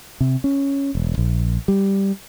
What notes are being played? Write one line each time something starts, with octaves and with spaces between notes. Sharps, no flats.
C3
C#4
E1
A#1
G3